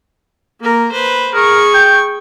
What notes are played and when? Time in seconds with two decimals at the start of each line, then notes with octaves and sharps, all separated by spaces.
0.60 A#3 A#4
0.92 B4 C5
1.34 G#4 A#4 C#6
1.74 G5